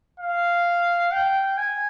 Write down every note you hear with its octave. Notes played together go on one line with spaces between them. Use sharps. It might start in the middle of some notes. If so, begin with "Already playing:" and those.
F5
G5
G#5